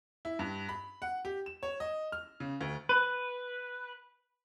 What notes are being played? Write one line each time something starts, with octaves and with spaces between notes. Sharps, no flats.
E4
G2
B5
F#5
G4
E7
C#5
D#5
F6
C#3
D2
B4